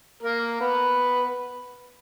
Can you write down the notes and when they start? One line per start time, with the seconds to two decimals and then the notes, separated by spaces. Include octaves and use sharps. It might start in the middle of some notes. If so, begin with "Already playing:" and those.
0.23 A#3 A#4
0.61 B3 B4